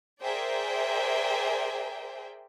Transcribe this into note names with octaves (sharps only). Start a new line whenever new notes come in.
G#4 A#4 C5 D5 E5 G5